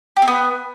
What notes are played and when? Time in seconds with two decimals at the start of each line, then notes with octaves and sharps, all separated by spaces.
0.17 G4
0.22 C4
0.28 B3